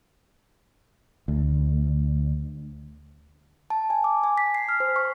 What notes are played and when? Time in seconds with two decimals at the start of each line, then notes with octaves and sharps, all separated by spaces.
1.28 D2
3.70 A5
3.90 G#5
4.04 D6
4.24 G#5
4.38 B6
4.55 C7
4.69 F6
4.80 C5
4.96 C#6